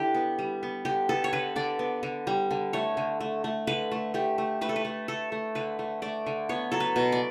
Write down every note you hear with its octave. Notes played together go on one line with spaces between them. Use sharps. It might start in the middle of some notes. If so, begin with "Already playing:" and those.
Already playing: D3 D4 E4 G4
B3
G3
B3
D3 G4
B3 A4
C#5
D3 B4
D3 D5
B3
D3
G3
D3
A3 C#5
D3
A3
A3
D3 B4
A3
A3 G4
A3
A3 B4
A4
B4
A3
A3 A4
A3
D3 B4
A3
A3 D5
D3
B3 C#5
F#3 A4
B4
B2
D5